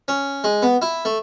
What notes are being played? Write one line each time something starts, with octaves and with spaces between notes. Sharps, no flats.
C#4
G#3
B3
E4
A3